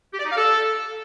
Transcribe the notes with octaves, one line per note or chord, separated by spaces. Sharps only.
G4
D5
D#4
F5
A4